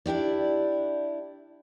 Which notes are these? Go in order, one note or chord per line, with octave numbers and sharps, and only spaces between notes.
D4 E4 G4 D5